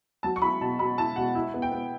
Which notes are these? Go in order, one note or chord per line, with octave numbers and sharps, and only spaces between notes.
F#3 A5
C#6
E4 B5
B2 A5
B2 B5
E4 A5
B2 F#5
E4
B3
G5
B3